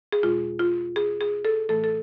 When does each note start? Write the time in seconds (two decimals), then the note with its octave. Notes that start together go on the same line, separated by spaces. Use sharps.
0.12 G#4
0.23 E2 B2 G#3 F4
0.59 F4
0.96 G#4
1.21 G#4
1.45 A4
1.69 A2 E3 A3 A4
1.84 A4